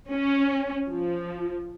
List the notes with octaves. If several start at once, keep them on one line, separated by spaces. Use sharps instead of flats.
C#4
F3